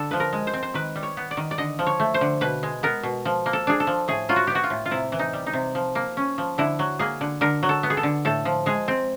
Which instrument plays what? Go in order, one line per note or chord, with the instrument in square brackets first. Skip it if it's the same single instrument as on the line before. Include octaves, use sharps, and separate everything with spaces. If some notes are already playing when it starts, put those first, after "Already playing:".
Already playing: [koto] D3 A4
F3 B4
A#4
G#3
C5
C4
C5
D#3 B4
G3
C#5
B3
D5
D#3
D5
D3 D#5
F3
C#5
A3
C5
D3
B2 B4
G#3
B3 A#4
B2
F3
A#3
A4
D4 G#4
A4
F3
A2 G#4
F#3 F4
F#4
B3 G4
F#4
F4
A2
F4
C3 E4
E3
D#4
G3
D#4
C3
F3
A#3
C#4
F3
D3 E4
F#3
A#3 G#4
D3
D3 A#4
F#3
A4
B3
G#4
A4
D3
A2 A4
F3
G#3 G#4
C4